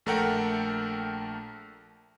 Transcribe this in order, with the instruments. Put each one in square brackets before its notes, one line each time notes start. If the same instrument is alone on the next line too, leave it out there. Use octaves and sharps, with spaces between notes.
[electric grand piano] A#1 A3 A4 A#4 F#5 G5